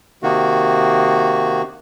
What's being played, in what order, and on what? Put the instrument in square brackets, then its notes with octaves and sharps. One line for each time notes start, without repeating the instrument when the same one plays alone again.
[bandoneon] C3 D#3 A#3 F#4